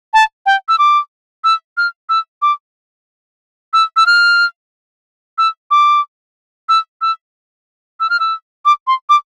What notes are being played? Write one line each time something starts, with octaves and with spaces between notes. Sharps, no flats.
A5
G5
E6
D6
E6
F6
E6
D6
E6
E6
F6
E6
D6
E6
E6
E6
F6
E6
D6
C6
D6